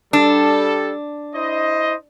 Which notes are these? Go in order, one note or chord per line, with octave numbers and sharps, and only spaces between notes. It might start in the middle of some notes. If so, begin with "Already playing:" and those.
G3 D4 A4
E4 C5 D#5